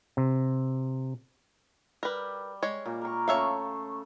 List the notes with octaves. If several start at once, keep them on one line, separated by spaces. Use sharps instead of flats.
C3
G3 A#4 B4
G#3 C#5
A#2
A#4 C#6
C#3 A3 C#5 E5 F5